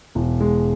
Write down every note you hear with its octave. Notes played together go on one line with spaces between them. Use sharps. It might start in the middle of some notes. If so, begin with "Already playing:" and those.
E1
G#3